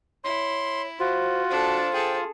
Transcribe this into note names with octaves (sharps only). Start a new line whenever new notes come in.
E4 C#5 C6
F4 F#4 C5
D4 A4 C5
G#4 A4 G5